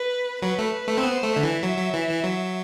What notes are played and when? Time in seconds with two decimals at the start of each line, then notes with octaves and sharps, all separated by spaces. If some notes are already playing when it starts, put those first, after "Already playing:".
Already playing: B4
0.42 F#3 B4
0.58 A3
0.72 B4
0.87 A3
0.97 C4
1.02 B3 C5
1.23 A3
1.33 D3 E5
1.43 E3
1.63 F#3
1.78 F#3
1.93 E3
2.09 E3
2.24 F#3